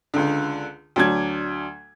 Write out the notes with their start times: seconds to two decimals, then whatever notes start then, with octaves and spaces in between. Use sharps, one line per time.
0.14 C#2 D3
0.96 D2 F#3 D4 G#6